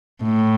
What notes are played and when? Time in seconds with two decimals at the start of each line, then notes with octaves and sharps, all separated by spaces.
0.23 A2